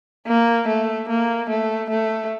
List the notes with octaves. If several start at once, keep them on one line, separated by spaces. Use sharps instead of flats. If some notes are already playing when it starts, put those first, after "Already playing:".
A#3
A3
A#3
A3
A3